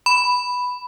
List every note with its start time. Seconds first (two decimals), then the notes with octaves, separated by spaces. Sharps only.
0.06 B5